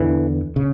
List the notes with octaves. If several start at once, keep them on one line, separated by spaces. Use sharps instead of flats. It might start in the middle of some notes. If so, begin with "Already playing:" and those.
Already playing: E2 D3 E3
C#3